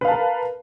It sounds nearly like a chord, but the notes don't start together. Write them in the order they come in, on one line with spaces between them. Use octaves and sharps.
B4 F5 A5 A#4